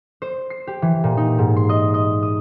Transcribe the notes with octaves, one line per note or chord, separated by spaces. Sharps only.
C5
C7
G4
E3
A#2
D#4
G#2
C6
D#5
D#5
D#6